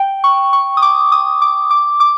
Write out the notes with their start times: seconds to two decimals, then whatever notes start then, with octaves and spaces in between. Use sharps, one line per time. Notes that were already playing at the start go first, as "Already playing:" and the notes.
Already playing: G5
0.24 C#6
0.53 C#6
0.77 D#6
0.82 D6
1.12 D#6
1.42 D6
1.71 D6
2.00 D6